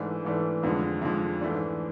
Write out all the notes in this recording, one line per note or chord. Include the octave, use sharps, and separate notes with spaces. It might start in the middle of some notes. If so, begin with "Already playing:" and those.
Already playing: G#2 E3 A3 D4
G#2 E3 A3 D4
F2 D3 F3 G#3
F2 D3 F3 G#3
G#2 E3 A3 D4